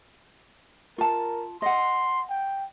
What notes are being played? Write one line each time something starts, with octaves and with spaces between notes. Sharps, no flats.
F4 A#4 A5
D#5 F#5 C6
G5